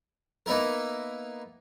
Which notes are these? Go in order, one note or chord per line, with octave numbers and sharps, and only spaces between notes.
A#3 B3 D#4 E4 A#4